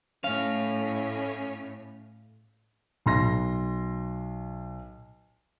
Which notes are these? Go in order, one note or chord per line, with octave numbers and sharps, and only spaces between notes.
A2 C#4 F5
B1 C6 A#6